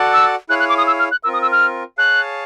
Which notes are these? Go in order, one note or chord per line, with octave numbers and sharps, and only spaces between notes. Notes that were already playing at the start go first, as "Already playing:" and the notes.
Already playing: F#4 A4 D5 F#5 A5
E6
E4 G#4 C#5 F5 F#6
F#6
D6
D#6
E6
F6
F#6
C4 F4 A#4 E6
D#6
E6
F6
G#4 C#5 F5 A5 F#6